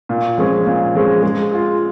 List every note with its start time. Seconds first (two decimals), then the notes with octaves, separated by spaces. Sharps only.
0.09 A#2
0.38 F3 G#3 C#4 G#4
0.66 A#2
0.95 F3 G#3 C#4 G#4
1.23 G#3
1.51 F4 G#4